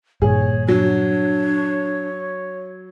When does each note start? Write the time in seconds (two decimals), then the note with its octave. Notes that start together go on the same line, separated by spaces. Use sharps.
0.22 G2 A#2 D#3 G#4 C#5
0.68 F#3 D4 C#5